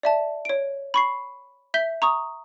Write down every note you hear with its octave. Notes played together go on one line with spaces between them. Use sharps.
D5 E5 A5
C#5 D7
B5 C#6 C7
E5 G6 B6 G7
A#5 C#6 D#6